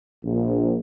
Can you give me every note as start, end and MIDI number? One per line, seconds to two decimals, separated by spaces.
0.24 0.79 34